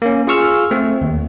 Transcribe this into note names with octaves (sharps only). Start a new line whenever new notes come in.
A#3 C#4
F4 G#4 F5 C#6 E6 F6
A3 C4
D#2